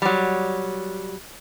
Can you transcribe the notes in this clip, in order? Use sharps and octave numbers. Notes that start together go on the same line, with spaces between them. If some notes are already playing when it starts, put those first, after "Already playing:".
F#3 G3